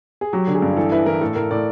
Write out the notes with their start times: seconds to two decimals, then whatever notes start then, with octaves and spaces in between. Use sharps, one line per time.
0.21 G#4
0.33 F#3 G4
0.47 D3
0.55 G#4
0.62 G2
0.73 G#4
0.77 E3 A4
0.92 E4 B4
1.06 E3 A#4
1.21 A2 A4
1.35 A2 A#4
1.50 A2 D5